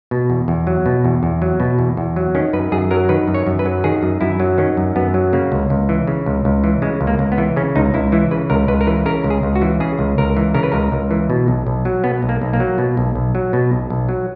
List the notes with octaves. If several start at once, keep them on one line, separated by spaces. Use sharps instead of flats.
B2
E2
E2
F#3
B2
E2
E2
F#3
B2
E2
E2
F#3
D#3 C#4
F#2 B4
F#2 G#4
F#3 A#4
D#3 B4
F#2
C#5
F#2
B4
F#3
D#3 G#4
F#2
F#2 E4
F#3
D#3 C#4
F#2
F#2 B3
F#3
C#3 A#3
C#2
C#2
E3
C#3
C#2
C#2
E3
C#3 G#3
C#2
A#3
C#2
B3
E3
C#3 C#4
C#2 D#4
C#2 E4
E3 E4
C#3 B4
C#2 A#4
C#2 B4
A#4
E3 B4
C#3 A#4
C#2
G#4
C#2
F#4
E3
C#3 G#4
C#2
C#2 A#4
E3
C#3 A#4
B4
C#2 A#4
C#2
E3
B2
B1
B1
F#3
B2 B3
B1
A#3
B1
A#3
F#3
B2
B1
B1
F#3
B2
B1
B1
F#3